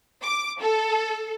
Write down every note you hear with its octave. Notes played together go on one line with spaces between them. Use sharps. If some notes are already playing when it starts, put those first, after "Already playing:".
D6
A4